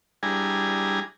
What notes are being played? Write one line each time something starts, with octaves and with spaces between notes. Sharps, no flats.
G3 D4 E4 G#4 G#5 A#5